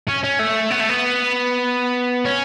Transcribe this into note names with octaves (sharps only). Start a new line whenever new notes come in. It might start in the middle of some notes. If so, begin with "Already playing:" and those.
C#4
C#4
A3
B3
A3
B3
C#4